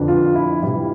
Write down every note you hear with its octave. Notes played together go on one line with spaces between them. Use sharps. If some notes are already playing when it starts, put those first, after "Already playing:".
Already playing: F2 D3 F3 B3 D4
F4
E4
C3 E3 G3 E4